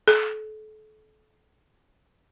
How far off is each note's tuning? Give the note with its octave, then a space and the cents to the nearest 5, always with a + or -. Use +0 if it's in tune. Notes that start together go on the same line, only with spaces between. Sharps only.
A4 -30